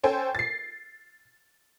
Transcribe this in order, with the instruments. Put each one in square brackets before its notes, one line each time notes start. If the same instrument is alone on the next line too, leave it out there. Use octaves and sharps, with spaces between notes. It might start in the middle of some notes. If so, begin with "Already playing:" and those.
[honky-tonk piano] C#4 A4 C5 G5 G#5
A6 C7